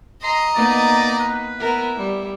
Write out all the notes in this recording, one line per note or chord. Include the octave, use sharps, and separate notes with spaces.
D#5 A#5 C6
A#3 B3 D#4 D5
B4
B3 E4 A#4
G3